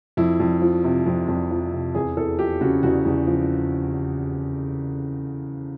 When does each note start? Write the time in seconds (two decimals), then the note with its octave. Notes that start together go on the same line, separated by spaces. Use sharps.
0.17 F2 E4
0.40 F2
0.62 F3
0.84 C3
1.06 F2
1.28 F2
1.51 F3
1.73 C3
1.95 E2 G#4
2.17 E2 A4
2.39 F3 G4
2.61 C#3 F#4
2.83 E2 F#4
3.05 E2
3.27 F3